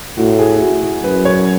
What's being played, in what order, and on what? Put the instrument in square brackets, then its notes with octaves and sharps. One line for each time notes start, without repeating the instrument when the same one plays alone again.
[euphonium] A2 [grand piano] F#4
[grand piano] G#4
E4
F#4
F#4
[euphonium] F#2 [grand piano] B4
[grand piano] C#5